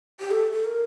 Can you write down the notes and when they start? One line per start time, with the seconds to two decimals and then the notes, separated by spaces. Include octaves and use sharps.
0.20 G4
0.31 A4
0.53 A4
0.65 A#4